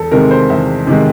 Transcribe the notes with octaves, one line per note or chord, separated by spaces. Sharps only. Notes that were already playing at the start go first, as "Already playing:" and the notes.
Already playing: E2 A4
C3 D#3 G#3 C4 A#4
C5
E2 E5
C3 D#3 G#3 C4